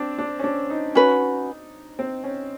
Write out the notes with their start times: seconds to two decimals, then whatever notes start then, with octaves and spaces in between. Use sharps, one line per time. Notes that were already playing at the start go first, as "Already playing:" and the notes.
Already playing: C4 D4
0.19 D4
0.39 C#4
0.44 D4
0.70 D#4
0.95 C#4 F#4 B4
1.99 C4
2.24 C#4